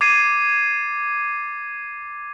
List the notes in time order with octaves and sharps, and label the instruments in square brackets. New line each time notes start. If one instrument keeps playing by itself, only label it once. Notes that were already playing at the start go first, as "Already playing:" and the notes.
[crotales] D6 G#6 A6 C7 D#7